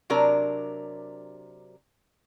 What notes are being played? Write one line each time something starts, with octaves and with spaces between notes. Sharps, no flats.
C3 F#3 D4 A#4